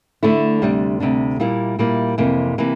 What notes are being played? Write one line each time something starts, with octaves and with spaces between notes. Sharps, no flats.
D3 A3 E4
D2 C3 G3 D4
D2 C3 G3 D4
A#2 G3 A#3 E4
A#2 G3 A#3 E4
F2 C3 E3 A#3
C3 E3 A#3